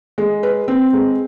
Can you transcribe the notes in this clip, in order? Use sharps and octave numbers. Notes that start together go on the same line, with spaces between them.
G#3
B4
C4
G#3